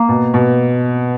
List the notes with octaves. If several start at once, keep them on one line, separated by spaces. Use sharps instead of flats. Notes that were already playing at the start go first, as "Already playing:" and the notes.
Already playing: A#3
B2
B2